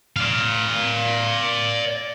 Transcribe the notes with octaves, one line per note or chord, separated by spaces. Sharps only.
D5 F5